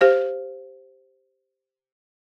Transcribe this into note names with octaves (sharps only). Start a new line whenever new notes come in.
G4 C5 F5